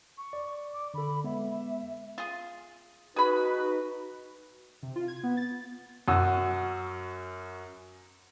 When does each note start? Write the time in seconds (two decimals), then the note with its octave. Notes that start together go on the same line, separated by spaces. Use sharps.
0.17 C#6
0.33 D5
0.73 D6
0.94 D3 A4 B5
1.24 G#3 B3 E5
2.18 F4 G#4
3.16 D#4 F#4 G#4 B4 B5
4.83 C3
4.96 F4
5.08 G#6
5.23 B3
5.37 A6
6.08 F#2 F#4 D#6 E6